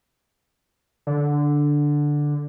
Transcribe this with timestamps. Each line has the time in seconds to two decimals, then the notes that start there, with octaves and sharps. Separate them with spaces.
1.07 D3